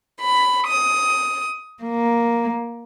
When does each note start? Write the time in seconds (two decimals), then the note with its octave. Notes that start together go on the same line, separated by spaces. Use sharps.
0.22 B5
0.68 D#6
1.84 A#3